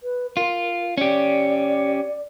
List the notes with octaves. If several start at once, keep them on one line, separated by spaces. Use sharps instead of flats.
B4
F4 A#4
C#4 G4 D5